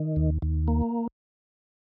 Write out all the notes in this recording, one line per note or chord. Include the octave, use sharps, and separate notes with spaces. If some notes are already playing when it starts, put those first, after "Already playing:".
Already playing: D#3
D#2
D#2
A#3